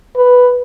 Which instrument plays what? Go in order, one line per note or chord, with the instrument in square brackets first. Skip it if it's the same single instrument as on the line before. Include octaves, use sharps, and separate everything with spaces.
[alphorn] B4